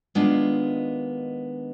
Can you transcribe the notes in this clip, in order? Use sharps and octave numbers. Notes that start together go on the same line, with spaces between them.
D#3 G#3 B3 D4 F4